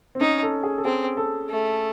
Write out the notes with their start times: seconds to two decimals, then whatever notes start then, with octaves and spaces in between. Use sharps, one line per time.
0.15 C4
0.20 C#4 D#4
0.43 A4
0.64 G#4
0.78 A4
0.85 C4 G#4
1.17 A4
1.49 A3